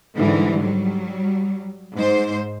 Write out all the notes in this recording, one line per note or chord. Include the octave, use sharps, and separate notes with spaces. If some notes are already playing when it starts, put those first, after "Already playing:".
G#2 D3 E3 G3
F#3 G3
G#2 C5